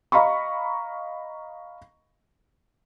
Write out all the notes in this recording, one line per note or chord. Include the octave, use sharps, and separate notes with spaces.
D#5 F5 A#5 B5 C#6